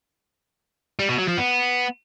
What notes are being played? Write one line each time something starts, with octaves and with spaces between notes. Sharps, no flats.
G3
B2
F#3
F3
B3